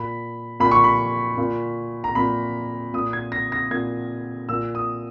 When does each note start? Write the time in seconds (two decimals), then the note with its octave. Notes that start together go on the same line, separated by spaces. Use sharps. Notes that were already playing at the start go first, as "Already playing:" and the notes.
Already playing: A#2 B5
0.60 A#2 B5
0.71 C#6
0.84 B5
1.38 A#2
2.04 A#5
2.15 A#2 B5
2.93 A#2 D#6
3.13 G#6
3.32 A#6
3.52 A#6
3.71 A#2 G#6
4.49 A#2 E6
4.75 D#6